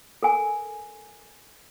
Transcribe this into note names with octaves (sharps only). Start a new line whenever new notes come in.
A4 A#4 G#5